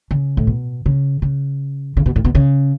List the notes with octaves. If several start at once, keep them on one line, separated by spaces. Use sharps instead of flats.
C#3
A2
B2
C#3
C#3
C#3
B2
A2
B2
C#3